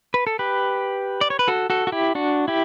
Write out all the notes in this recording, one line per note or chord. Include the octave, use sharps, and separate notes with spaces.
B4
A4
G4 B4
D5
C#5
B4
F#4 A4
F#4 A4
F#4
E4 G4
D4 F#4
E4 G4